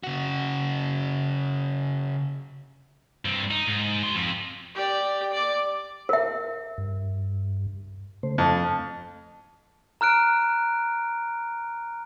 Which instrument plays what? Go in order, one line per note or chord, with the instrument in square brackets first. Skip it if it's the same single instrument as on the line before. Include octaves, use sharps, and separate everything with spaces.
[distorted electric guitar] C#3 F#4
G2 C4
D#4
G#2
F#4 C6
F2
[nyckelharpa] G4 D5
D5 D6
[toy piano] A#4 E5
[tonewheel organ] G2
C#3 A3 C5
[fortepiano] F2 [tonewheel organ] A3
[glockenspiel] A#5 F6 F#6 D7